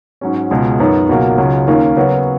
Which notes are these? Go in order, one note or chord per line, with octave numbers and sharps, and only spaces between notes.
G#2 F#3 C#4
C#2 B2 G#3
F#2 D#3 F#3 B3 D#4
C#2 B2 F#3 A#3
C#2 C#3 F#3
D#2 D#3 A#3 C#4 F4
C#3 F#3 B3 F#4 A#4